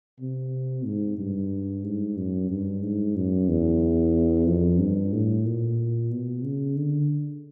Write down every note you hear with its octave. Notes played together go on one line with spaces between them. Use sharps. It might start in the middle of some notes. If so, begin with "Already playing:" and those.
C3
G#2
G2
G#2
F#2
G2
G#2
F#2
E2
F2
G2
A2
A#2
B2
C#3
D3